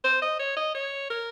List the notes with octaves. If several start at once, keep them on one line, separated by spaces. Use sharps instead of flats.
C5
D#5
C#5
D#5
C#5
A#4